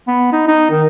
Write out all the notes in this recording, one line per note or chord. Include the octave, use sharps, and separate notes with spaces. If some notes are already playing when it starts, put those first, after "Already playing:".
B3
D#4
D#4
D#3